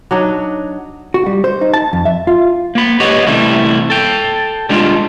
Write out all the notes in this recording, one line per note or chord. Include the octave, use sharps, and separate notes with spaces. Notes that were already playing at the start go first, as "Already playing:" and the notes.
F#3 D4 D#4
F#4
G3
C5
D#4
A5
F2
E5
F4
A#3 B5
G4 B4 C#5 D#5 F#5
C3 E3 G3 A3 E4
A4 G5
G3 G#3 D4 F4